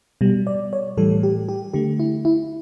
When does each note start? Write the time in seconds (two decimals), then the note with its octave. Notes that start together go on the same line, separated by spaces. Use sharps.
0.21 B2 G3
0.47 D5
0.73 C#5
0.97 A2 E3 G3 A4
1.23 G4
1.49 G4
1.73 D3 A3 G4
2.00 E4
2.25 E4